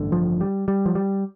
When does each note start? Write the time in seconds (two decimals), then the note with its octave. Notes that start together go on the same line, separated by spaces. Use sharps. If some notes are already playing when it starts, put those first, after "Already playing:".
Already playing: A1 G2 D3
0.12 F3
0.41 G3
0.68 G3
0.86 F3
0.95 G3